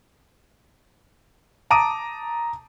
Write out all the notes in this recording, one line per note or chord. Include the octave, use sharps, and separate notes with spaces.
A5 A#5 D6 D#6 D7 D#7